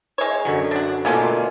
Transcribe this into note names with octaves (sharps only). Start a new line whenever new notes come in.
G#3 C#5
F#2 D3 F#3
D4 F#5
B2 D3 A3 A#3 C#4 F4